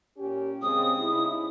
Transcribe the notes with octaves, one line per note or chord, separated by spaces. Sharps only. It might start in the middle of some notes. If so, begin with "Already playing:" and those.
A#2 C#4 G4
C#3 G#3 C4 D#6
C#3 D#4 E4